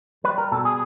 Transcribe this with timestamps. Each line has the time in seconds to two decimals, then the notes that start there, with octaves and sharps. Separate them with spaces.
0.24 G3 B4
0.38 A#4
0.52 B2 A4
0.65 G#4